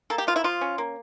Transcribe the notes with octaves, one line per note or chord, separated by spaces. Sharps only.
A#3 A4
G4
F3 F4
E4
F3 F4
C#4
A#3